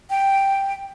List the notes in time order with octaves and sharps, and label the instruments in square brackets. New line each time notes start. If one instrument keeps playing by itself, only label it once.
[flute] G5